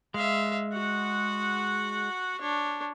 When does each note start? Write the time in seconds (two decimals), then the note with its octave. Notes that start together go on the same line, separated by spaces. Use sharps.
0.14 G#3 E5 F5
0.73 F#4 F#5
2.41 D4 C#5